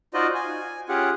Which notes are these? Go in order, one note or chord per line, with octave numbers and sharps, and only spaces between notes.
D#4 F4 F#4 C5 D5 D#5
G#5
C#4 F4 G4 G#4 F#5